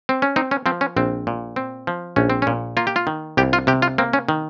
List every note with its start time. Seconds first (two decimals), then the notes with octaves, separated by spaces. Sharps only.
0.09 C4
0.22 C#4
0.36 C4 D#4
0.51 C#4
0.66 F3 C4
0.81 C#4
0.97 A#1 C4
1.27 A#2
1.56 C4
1.87 F3
2.16 A#1 C#4
2.30 C4
2.42 A#2 C#4
2.77 A#3 F4
2.87 G4
2.96 F4
3.07 D#3
3.37 C2 G4
3.53 F4
3.67 C3 G4
3.82 F4
3.98 A#3 C4
4.13 C#4
4.29 D#3